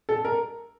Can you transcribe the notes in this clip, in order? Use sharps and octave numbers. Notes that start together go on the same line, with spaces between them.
A4
A#4